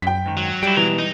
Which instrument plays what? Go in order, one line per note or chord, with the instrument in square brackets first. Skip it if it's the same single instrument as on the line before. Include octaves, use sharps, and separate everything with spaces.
[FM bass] F#2 [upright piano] G5 B6
[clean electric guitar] G#2 D#3
[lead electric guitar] F#3
[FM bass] G3 [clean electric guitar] E4 G5
[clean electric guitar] B2 G#3 A#5 [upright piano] E3
[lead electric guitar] D#4